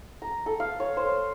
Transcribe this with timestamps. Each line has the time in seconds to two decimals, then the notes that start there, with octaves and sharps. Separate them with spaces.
0.22 A#5
0.46 A4
0.60 F5
0.80 C#5
0.97 C5